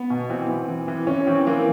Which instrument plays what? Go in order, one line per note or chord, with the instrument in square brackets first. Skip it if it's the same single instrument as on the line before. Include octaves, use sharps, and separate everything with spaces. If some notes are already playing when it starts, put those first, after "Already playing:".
Already playing: [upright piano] B3
B2
E3 C4
E3
E3
E3
E3 C#4
E3 C4
E3 A#3